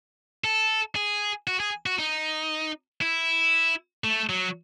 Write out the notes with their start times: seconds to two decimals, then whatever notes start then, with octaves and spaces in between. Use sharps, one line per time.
0.44 A4
0.95 G#4
1.47 F#4
1.60 G#4
1.86 F#4
1.99 D#4
3.01 E4
4.04 A3
4.29 F#3